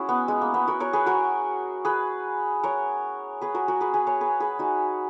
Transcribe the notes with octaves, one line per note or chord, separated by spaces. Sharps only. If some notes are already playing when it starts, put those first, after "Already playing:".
Already playing: C#4 E4 F#4 G#4
B3
G#3
A#3
B3
F#4 A#4
A#4 C#5
G#4 B4
F#4 A#4
G#4 B4
A#4 C#5
G#4 B4
F#4 A#4
F#4 A#4
G#4 B4
G#4 B4
A#4 C#5
G#4 B4
G#4 B4
D#4 F#4